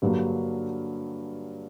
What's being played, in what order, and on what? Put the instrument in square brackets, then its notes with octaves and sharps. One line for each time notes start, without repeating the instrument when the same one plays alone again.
[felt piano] G2 D3 F#3 A#3